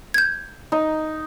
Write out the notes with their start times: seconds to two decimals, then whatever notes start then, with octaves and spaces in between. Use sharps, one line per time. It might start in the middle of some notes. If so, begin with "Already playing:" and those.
0.14 G6 G#6
0.72 D#4